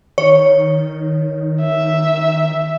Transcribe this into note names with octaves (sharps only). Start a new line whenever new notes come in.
D#3 C#5
E5